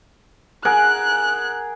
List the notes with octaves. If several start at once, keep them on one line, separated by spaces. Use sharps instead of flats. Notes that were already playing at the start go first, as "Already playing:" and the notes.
G#4 A#4 F#5 F#6